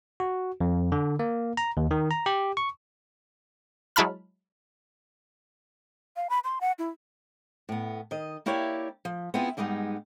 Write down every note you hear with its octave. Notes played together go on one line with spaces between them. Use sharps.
F#4
F2
D3
A#3
A#5
D#2
D#3
A#5
G4
C#6
F#3 G#3 E4 A5 B5 F6
F5
B5
C6
F#5
E4
A2 B3
D#3 D#5
A#3 E4 G4 C#5 D5 E5
F3
B3 C4 E4 F4 G#4
G#2 G3 G#3 B3 D#4